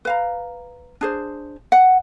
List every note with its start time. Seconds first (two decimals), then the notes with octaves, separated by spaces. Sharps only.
0.05 B4 F5 A#5
1.01 D4 G#4 C5
1.72 F#5